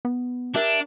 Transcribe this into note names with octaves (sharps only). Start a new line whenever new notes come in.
B3
D4 G4 A#4 E5